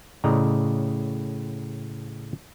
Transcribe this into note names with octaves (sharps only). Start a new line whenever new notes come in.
A2 C#3 D5 D#5 A#5